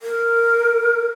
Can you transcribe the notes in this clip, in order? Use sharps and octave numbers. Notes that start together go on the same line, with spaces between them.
A#4